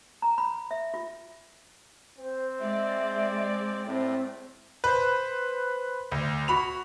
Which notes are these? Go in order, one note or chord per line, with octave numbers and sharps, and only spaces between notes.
A#5
B5
E5
F4
C4 C5
G#3 D5 E5
A2 C4
B4 C5
D2
F#4 B5 F7